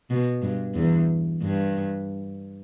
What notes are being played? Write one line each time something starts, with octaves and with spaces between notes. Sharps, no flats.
B2
G2
E2
G2